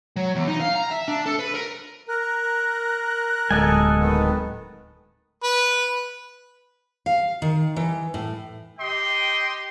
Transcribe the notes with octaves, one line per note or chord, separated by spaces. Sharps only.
F#3
E2
D#4
F5
A#5
E5
D4
A4
B4
A#4
A#4 F#6
D1 D2 G#3 A4 D#5 G#5
D#3 B3
B4
F5
D#3
E3
A2
G4 D#5 G5 C6